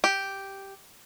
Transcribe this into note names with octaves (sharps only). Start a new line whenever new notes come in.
G4